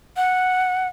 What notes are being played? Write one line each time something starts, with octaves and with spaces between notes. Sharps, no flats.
F#5